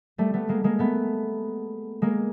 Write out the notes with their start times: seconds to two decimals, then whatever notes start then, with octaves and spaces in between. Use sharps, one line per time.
0.18 G3 A3
0.34 A3 B3
0.49 G#3 A#3
0.64 G#3 A#3
0.79 A3 B3
2.02 G#3 A#3